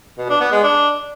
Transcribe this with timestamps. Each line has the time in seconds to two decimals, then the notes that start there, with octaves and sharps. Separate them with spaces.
0.18 B2
0.29 D4
0.41 B3
0.52 G#3
0.63 D4